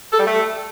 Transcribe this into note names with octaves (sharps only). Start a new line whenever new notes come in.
A4
G3
A3